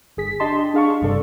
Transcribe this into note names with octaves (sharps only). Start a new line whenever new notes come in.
G1 G#4 B6
D4 G4 D#5 A5 C6
D4 G#4 F5 A5 C#6
G1 G2 C3 A4 D5